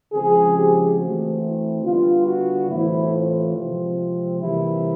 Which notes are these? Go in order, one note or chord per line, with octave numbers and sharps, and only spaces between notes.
C#3 F3 G#3 C4 G#4
G4
E3 A3 C4 F#4
E4
D3 G3 B3 F4
F#4
A2 E3 A3 C4 E4
F4
C3 F3 G#3 C4
C3 E3 G3 A#3 E4